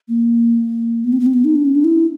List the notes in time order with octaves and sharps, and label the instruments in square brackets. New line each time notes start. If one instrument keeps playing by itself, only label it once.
[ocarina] A#3
B3
C4
B3
C4
B3
D#4
D4
C#4
D4
E4